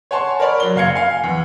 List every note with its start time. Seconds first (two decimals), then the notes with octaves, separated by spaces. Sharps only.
0.11 C#5 F#5 G#5 A5 C6
0.40 A#4 C#5 D5 B5
0.60 F#3 G7
0.76 F#1 F5 G#6 C#7
0.95 F5 G#5
1.24 E2